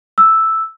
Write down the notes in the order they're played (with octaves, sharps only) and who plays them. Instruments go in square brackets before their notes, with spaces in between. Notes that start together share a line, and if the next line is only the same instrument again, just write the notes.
[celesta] E6